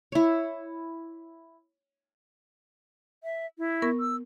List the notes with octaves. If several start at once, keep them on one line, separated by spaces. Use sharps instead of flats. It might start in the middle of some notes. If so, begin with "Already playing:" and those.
E4 C#5
E5
E4
B3 A#4 C#6
E6